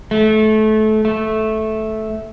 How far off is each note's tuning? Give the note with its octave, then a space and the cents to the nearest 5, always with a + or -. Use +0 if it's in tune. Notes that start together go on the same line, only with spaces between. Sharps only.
A3 -25
A3 -10